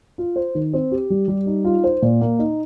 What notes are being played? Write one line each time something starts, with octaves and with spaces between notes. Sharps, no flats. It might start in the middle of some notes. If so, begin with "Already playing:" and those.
F4
C5
D#3
C4
G4
G3
G3
D#4
F4
C5
A#2
A#3
D#4